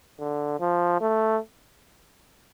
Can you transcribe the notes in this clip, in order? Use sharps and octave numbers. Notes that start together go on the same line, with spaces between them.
D3
F3
A3